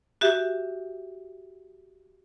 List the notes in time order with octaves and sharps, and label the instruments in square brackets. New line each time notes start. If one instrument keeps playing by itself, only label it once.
[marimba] F#4 G4 E5